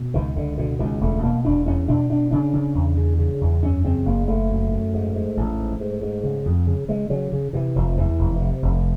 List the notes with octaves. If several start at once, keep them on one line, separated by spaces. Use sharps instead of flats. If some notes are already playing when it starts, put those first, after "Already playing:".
Already playing: B2
C#2 D#3
C#2 D3
B2 D3
C#2 D#3
E1 A3
B2 A#3
E1 D4
E2 C#4
B2 D4
B2 D4
C#3 D4
C#3
E2
C#3
C#3
E2
F#2 C#4
C#3 C4
F#1 A#3
F#1 A3
F#2
F#2
G#2
G#2
A1
G#2
G#2
G#2
C#3
F2
C#3
C#3 G#3
C#3 F#3
C#3
C3 E3
F1 F3
E2 E3
F1
C3
F1